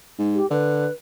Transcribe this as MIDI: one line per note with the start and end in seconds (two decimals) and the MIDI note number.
0.19 0.41 44
0.34 0.49 67
0.50 0.87 50
0.50 0.92 71